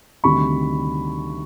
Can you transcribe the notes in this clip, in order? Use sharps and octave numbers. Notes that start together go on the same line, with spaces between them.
D2 C3 D#3 G3 B5 C#6